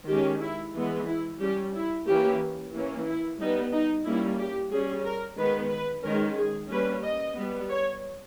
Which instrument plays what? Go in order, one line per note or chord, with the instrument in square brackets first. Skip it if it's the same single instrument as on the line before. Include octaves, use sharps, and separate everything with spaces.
[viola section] D#3 G#3 C#4 G4
E4
E3 G#3 B3
E4
G3 C#4 G4
E4
E3 A#3 C#4 G4
E3 A#3 C#4
E4
G3 B3 D#4
D#4
G3 A#3 C#4 E4
G4
G3 C#4 G#4
A#4
D#3 G#3 B3 B4
B4
D#3 G#3 C#4 A#4
G#4
G3 A#3 C#4 B4
D#5
G3 B3
C#5